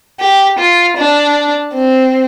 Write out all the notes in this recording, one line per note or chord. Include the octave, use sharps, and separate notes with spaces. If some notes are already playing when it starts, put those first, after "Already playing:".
G4
F4
D4
C4